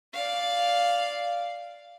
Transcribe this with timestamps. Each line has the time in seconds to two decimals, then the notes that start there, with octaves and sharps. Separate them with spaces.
0.13 D5 F5